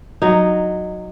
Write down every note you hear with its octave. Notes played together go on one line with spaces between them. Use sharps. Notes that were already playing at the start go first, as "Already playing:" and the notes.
F#3 D#4